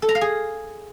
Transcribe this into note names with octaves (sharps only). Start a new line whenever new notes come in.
A4
A#5
F5
G#4